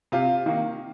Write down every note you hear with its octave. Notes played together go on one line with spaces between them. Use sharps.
C3 F4
D#3 A#3